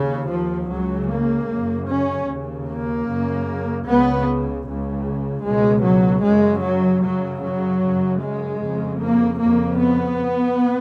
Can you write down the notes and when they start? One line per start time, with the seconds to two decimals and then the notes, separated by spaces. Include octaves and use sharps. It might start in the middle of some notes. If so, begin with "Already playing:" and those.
Already playing: D#2 C#3
0.30 F3
0.69 C#2 C#3 F#3
1.09 A#3
1.49 F#2 C#3
1.89 C#4
2.28 D#2 C#3
2.68 A#3
3.08 F#2 C#3
3.86 C#2 C#3 B3
4.66 C#2 C#3
5.45 C#2 B2 G#3
5.84 F#3
6.24 F#2 C#3 G#3
6.64 F#3
7.03 F#2 C#3 F#3
7.42 F#3
7.82 F#2 C#3
8.22 G#3
8.62 F2 C#3
9.01 A#3
9.40 F2 C#3 A#3
9.80 B3